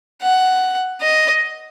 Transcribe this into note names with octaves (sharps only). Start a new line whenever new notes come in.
F#5
D#5